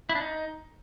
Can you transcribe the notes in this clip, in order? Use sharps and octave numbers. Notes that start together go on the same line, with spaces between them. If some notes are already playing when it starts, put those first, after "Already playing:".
E4
D4
D#4